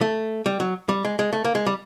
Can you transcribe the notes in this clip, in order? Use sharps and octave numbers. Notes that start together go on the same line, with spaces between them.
A3
G3
F#3
G3
G#3
G#3
A3
A#3
G#3
G3